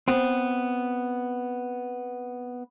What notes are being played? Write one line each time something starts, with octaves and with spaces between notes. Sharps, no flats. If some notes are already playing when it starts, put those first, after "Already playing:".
B3 C4